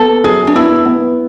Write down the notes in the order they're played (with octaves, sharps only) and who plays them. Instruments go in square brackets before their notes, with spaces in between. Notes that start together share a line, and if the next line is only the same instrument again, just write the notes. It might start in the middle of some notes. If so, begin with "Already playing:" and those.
Already playing: [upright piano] B3 [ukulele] A4
[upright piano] F#2 [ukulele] G#4
[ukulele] D4
[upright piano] B3 [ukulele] E4
[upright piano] B3